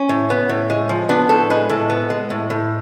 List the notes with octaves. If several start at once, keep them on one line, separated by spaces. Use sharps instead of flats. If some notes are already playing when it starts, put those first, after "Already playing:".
Already playing: C#4
A2
B3
A2
G#3
F3
B3 D4
A2 A4
G#3 B4
A2 A4
B3
G#3
A2
A2